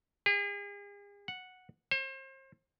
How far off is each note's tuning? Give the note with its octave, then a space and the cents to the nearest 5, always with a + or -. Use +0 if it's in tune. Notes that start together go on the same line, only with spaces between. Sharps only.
G#4 -40
F#5 -5
C5 +35